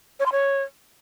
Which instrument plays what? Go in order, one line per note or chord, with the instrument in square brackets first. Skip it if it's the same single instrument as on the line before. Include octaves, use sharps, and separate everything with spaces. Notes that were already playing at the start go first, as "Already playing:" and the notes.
[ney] C#5
C6
C#5